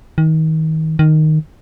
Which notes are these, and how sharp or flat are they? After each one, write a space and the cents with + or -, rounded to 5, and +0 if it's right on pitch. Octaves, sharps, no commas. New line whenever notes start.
D#3 +30
D#3 -5